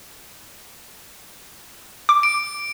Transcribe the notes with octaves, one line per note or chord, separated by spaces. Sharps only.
D6
D7